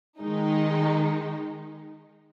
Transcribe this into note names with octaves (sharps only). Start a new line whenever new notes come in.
D#3 G#3 D#4